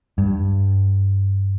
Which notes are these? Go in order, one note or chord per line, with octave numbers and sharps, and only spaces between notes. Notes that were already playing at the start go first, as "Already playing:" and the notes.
G2